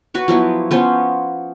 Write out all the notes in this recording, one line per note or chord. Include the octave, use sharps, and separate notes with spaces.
F#4 B4 C#5
F3 F#3 B3 E4
F3 B3 C#4 C5